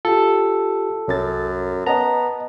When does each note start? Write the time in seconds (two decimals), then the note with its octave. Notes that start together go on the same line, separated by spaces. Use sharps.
0.05 F4 G4 A4
1.08 C2 F#2 A6
1.86 B3 D#5 A5 A#5